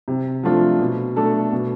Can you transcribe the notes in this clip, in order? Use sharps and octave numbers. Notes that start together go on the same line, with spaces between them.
C3
F3 A3 D4 F4
B2
A3 D4 A4
B2